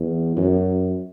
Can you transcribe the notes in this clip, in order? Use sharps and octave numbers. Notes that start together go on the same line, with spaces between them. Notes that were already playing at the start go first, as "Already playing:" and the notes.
Already playing: E2
F#2